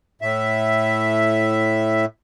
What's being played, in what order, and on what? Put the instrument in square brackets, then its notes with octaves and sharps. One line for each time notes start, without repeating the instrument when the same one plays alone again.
[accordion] A2 E5